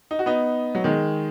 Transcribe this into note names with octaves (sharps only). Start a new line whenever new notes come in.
D#4
F#4
B3 D#4
F#3
D#3 G#3